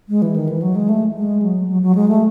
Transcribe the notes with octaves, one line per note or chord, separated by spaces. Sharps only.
G#3
E3
D#3
E3
F#3
G#3
A3
G#3
F#3
F#3
F#3
G#3
A3